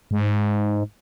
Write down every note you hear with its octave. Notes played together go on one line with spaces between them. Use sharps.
G#2